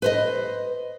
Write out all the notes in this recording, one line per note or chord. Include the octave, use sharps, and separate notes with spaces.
B4 C5 D#5